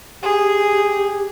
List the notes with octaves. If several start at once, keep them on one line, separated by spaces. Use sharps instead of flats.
G4 G#4